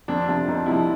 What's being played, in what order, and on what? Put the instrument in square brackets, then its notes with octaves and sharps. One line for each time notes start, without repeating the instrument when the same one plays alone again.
[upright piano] F2 [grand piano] D4
[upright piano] C3 F3
[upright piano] F2 [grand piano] D#4
[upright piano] C3 F3 [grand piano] E4